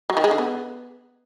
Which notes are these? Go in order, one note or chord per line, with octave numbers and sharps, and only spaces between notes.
F#3
D#3
G#3
D3
B3